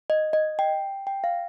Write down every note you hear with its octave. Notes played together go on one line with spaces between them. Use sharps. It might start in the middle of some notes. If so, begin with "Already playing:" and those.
D#5
D#5
G5
G5
F5